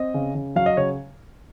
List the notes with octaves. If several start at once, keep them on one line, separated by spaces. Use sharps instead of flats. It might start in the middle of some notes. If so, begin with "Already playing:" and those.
Already playing: C4 D#5
C#3
C#3
F#3 F5
D#5
C#3 C#5